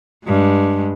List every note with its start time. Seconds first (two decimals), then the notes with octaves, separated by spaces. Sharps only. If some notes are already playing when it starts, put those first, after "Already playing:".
0.25 G2 G#3